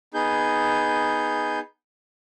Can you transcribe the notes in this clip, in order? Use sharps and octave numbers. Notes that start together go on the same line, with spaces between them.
B3 D#4 G#4 G6